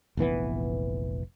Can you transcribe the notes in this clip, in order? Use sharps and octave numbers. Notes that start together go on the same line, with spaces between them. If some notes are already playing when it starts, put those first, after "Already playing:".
F1 A#1 E3 B3